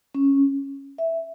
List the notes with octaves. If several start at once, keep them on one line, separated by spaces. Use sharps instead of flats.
C#4
E5